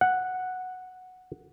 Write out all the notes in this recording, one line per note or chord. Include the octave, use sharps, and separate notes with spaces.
F#5